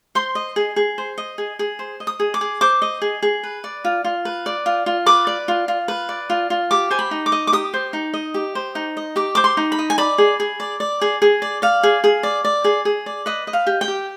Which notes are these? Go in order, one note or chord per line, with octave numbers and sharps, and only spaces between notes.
C5 C6
D#5
G#4
G#4
C5
D#5
G#4
G#4
C5
D#5
D#6
G#4
D6
G#4
C5 D6
D#5
G#4
G#4
B4
D5
F4
F4
B4
D5
F4
F4
B4 D6
D5
F4
F4
B4
D5
F4
F4
G4 D6
C5 G#5
B5
D#4
D6
D#5
D6
G4 D#6
C5
D#4
D#5
G4
C5
D#4
D#5
G4 D6
C5 D6
C6
D#4
B5
D#5
G#5
D5 B5
G#4
G#4
D5
D5
G#4
G#4
D5
D5 F5
G#4
G#4
D5
D5
G#4
G#4
D5
B4 D#5
D#5
F5
G4
G5
G4